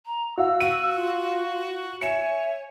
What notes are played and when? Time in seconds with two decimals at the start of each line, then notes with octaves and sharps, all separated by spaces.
0.06 A#5
0.38 F#4 F5 E6
0.60 F#4 F5 D#7
0.96 F4
2.01 C#5 E5 G#5 C#7 E7